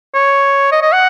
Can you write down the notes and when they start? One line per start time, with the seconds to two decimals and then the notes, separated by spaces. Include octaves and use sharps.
0.14 C#5
0.72 D#5
0.82 D#5
0.92 F#5